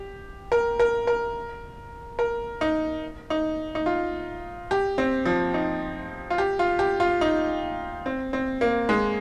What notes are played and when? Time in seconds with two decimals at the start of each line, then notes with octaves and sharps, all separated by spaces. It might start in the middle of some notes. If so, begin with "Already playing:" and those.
Already playing: G4
0.52 A#4
0.80 A#4
1.07 A#4
2.19 A#4
2.61 D#4
3.30 D#4
3.75 D#4
3.86 F4
4.71 G4
4.98 C4
5.26 F3
5.54 D#4
6.30 F4
6.38 G4
6.59 F4
6.79 G4
7.00 F4
7.21 D#4
8.06 C4
8.33 C4
8.61 A#3
8.89 G#3